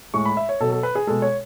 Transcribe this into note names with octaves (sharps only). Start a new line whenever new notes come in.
A2 G#3 C#6
B5
E5
C#5
B2 F#3 A4
A4
B4
G#4
B2 G#3 A4
C#5